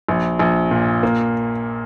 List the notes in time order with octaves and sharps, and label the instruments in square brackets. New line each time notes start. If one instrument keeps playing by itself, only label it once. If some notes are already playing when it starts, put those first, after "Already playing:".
[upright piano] A#1
A#1
A#2
A#3